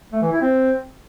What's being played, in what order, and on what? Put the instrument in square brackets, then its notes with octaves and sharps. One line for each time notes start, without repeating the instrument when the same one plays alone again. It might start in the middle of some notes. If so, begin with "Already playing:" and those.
[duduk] A3
E3
E4
C4